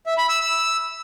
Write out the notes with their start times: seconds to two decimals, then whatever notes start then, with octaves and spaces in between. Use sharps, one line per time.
0.06 E5
0.18 B5
0.29 E6
0.40 E6